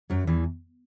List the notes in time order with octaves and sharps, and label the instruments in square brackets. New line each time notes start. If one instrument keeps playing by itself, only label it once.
[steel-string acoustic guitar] F#2 F#3
E2 E3